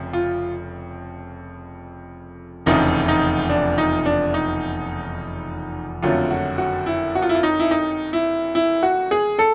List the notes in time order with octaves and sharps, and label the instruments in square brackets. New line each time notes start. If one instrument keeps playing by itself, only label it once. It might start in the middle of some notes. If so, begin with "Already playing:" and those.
Already playing: [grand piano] F1 F2 C#3 F3
F4
F1 E2 C#3 F3 D#4
D#4
D4
D#4
D4
D#4
F#1 F2 D3 F#3 A3 F4
F#4
F#4
E4
F#4
F4
E4
F4
D#4
E4
D#4
E4
E4
F#4
G#4
A4